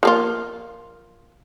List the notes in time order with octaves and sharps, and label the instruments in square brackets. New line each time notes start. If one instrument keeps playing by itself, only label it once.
[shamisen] F3 A#3 F4